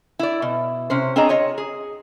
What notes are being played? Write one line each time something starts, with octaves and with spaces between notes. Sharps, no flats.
E4 D5
B2
C3 C#4 C5
C4 D4 G#4 C#5 D#5 A#5
F4 C#5 D#5
G#4